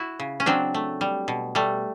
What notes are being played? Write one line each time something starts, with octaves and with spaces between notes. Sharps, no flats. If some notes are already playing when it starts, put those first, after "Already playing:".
Already playing: E4 F#4
C#3
C#4
F#3 C4 D4
A3
G3
B2
G3 A3